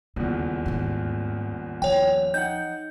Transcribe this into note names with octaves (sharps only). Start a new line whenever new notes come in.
D#1 E2 C#3
D#2 G#2
F3 C#5 G5
D#4 F#5 G6